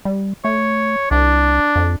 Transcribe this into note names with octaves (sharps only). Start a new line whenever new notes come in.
G3
A3 C#5
C2 D4
F2